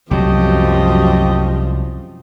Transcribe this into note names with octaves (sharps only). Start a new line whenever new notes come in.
C2 F#2 F3 F#3 A3 G4 D#5